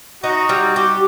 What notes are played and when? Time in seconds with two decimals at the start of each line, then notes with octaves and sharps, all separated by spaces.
0.23 D#4 F#4
0.49 G3
0.76 G4